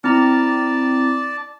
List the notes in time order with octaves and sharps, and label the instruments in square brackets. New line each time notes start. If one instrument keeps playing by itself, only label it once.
[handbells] C4 E4 A#5 [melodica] D5 A5